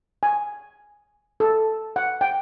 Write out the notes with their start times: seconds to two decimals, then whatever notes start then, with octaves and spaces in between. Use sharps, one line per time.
0.23 G#5
1.40 A4
1.96 F#5
2.21 G5